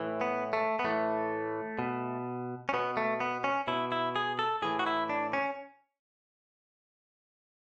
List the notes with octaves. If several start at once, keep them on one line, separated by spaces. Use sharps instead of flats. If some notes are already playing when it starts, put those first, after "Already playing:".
Already playing: A2 E3
B3
A3
B3
A2 E3 A3
B2
C#4
B2 B3
A3
B3
C#4
B2 E4
E4
G#4
A4
A2 E3 G#4
F#4
E4
D4
C#4